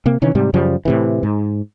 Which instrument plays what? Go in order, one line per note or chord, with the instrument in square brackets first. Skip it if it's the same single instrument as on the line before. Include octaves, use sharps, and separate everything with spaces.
[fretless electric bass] C3 A#3
C3 D#3 E3 C#4
G#2 C3 G3
F#2 C#3 F3 G3
A2 C3 E3
G#2